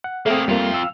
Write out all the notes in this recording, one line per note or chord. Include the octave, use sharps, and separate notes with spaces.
F#5
A3 A#3 C4 G#4
F2 G3 A#3 F4
F5 E6